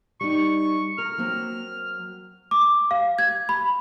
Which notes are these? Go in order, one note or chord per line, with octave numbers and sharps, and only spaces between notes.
G3 D#4 C#6
A#4 F6
F#3 A#3 C4
D6
F5
G#6
B5